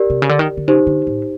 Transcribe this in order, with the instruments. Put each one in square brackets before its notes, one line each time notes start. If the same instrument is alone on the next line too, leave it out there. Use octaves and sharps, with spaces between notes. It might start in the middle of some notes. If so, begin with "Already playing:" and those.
Already playing: [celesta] G4 A#4 D5
[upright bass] C3
C#3
D3
D#3
D3
[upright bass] C#3 [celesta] D#4 G4 C5
[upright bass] D3
A2